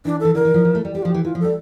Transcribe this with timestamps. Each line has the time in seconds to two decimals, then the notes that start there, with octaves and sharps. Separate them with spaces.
0.05 E3 D4
0.20 E3 A4
0.35 D3 A#4
0.45 E3
0.54 F3
0.65 F3
0.75 A3
0.85 G3
0.95 G3 G4
1.03 F3 F4
1.10 E3 G4
1.24 E3 F4
1.35 F3
1.40 G3 A4